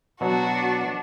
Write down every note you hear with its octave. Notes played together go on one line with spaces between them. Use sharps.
B2 F#3 D4 F#4